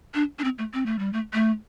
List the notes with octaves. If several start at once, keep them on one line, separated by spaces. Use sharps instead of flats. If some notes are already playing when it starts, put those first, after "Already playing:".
D4
D4
C4
A3
C4
A3
G3
A3
A3